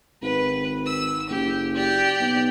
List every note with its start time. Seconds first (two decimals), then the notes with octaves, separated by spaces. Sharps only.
0.22 G#1 B4
0.86 E6
1.29 F#1 G4
1.75 G4 D5
2.20 B1